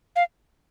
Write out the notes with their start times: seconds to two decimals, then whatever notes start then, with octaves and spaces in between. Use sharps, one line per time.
0.16 F5